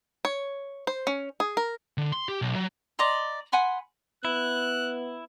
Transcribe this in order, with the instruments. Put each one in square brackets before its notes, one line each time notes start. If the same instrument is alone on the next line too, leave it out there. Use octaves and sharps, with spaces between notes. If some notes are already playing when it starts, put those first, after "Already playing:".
[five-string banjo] C#5
C5
C#4
G#4
A#4
[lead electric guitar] D3
C6
G4
B1
F#3
[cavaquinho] D5 D#5 A#5 C6
F#5 G#5 B5 C6
[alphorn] B3 [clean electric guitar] E4 [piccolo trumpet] F#6